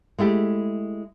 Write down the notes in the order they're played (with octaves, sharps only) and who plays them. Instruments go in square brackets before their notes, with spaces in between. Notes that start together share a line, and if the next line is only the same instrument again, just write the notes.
[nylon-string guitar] G#3 A3 E4 G4